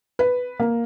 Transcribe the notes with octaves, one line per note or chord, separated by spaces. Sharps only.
B4
A#3